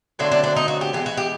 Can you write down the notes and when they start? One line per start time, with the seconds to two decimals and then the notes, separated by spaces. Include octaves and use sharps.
0.19 D3 F#3 A3 C4 D4
0.32 D4
0.44 D4
0.56 D#4
0.68 F#4
0.81 G4
0.93 E3 G#3 B3 G4
1.06 F#4
1.17 G4